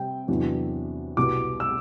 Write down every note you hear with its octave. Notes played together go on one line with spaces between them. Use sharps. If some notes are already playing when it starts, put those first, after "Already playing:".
Already playing: C3 G3 C4 G5
E2 C3 F#3 B3 D4
C2 B2 G3 B3 D6
E6